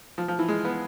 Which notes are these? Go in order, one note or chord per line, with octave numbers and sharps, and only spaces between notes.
F3
F3
E3
G#3
B3